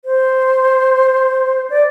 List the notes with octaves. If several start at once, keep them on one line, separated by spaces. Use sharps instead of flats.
C5
D5